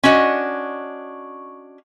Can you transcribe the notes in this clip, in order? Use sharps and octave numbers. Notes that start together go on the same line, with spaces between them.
C#4 D4 F#4 D#5